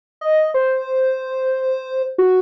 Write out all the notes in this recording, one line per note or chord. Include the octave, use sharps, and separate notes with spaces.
D#5
C5
F#4